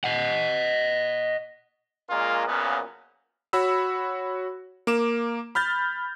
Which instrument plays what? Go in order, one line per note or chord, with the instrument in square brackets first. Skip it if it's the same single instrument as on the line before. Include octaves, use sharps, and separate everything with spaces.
[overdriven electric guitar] D#5 F#5
[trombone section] A#2 G#3 A#3 C#4 F4
F#2 A#2 C#3 F3 B3
[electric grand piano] F#4 C#5 B5 E6
A#3 D6 E7
B5 F6 G6 A6